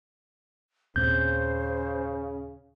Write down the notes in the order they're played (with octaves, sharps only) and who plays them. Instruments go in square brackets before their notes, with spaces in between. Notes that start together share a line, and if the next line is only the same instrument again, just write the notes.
[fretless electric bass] D#2 A#2 C4 [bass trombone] C#3 [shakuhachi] C5 [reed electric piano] G6